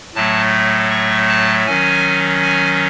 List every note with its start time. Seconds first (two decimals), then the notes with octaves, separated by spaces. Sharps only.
0.15 A2 F#3 A3 A5
0.91 C#6
1.29 A5
1.66 D#3 F#3 C#4 G#5
2.42 G#5